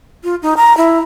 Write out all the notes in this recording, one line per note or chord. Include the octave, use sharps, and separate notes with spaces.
F4
D#4
A#5
E4